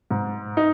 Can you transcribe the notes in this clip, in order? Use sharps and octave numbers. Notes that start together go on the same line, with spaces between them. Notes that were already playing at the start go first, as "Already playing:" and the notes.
G#2
D#4